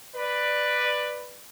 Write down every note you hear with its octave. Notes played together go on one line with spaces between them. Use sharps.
B4 D5